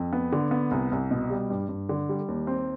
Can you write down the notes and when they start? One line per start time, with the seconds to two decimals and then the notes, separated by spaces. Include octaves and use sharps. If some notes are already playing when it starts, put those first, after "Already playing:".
Already playing: F2
0.13 B3
0.32 D3
0.51 B3
0.71 C2
0.92 C2
1.11 B2
1.30 G3
1.50 G2
1.69 G2
1.89 D3
2.09 G3
2.28 D#2
2.47 C4